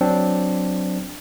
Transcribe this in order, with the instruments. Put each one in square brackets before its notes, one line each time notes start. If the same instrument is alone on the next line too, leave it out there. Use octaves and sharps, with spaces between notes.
[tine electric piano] F#3 C4 D4